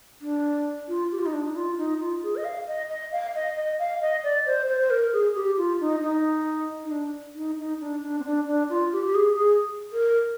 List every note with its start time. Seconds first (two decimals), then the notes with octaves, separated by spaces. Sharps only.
0.21 D4
0.89 F4
1.12 G4
1.19 F4
1.26 D#4
1.33 D4
1.47 D#4
1.56 F4
1.78 D#4
2.00 F4
2.23 G#4
2.36 D#5
2.45 F5
2.67 D#5
2.89 D#5
3.12 F5
3.35 D#5
3.56 D#5
3.79 F5
4.01 D#5
4.24 D5
4.46 C5
4.68 C5
4.81 C5
4.90 A#4
5.13 G#4
5.35 G4
5.58 F4
5.80 D#4
6.02 D#4
6.84 D#4
6.91 D4
7.36 D#4
7.58 D#4
7.80 D4
8.03 D4
8.20 C4
8.25 D4
8.47 D4
8.70 F4
8.93 G4
9.06 G4
9.15 G#4
9.37 G#4
9.92 A#4